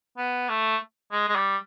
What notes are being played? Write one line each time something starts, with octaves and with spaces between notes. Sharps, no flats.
B3
A3
G#3
G#3
G3